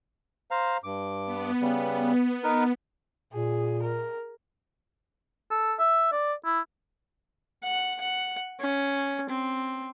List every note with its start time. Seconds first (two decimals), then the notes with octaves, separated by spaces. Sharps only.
0.51 C5 F5 A#5
0.84 G2 D6
1.26 B3
1.61 C#3 G3
2.44 D#4 A#4 B4
3.33 A#2 G#4
3.83 A#4
5.51 A4
5.79 E5
6.12 D5
6.45 E4
7.63 F#5
8.00 F#5
8.60 C#4
9.29 C4